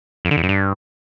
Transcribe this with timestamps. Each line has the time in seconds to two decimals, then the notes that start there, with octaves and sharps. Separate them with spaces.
0.25 F2
0.31 D3
0.37 E2
0.43 F#2
0.49 G2